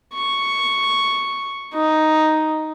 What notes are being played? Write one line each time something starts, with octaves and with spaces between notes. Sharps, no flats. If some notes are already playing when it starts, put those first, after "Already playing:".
C#6
D#4